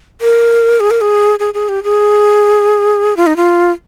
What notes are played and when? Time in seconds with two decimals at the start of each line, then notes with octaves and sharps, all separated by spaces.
0.21 A#4
0.80 G#4
0.91 A#4
1.01 G#4
1.39 G#4
1.54 G#4
1.69 G4
1.83 G#4
3.17 F4
3.27 D#4
3.36 F4